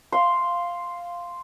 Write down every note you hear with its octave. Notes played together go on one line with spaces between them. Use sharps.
F5 C6